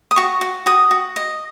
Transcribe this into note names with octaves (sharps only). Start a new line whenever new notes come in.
D#6
F#4 C#6
F#4
F#4 D#6
F#4
D#5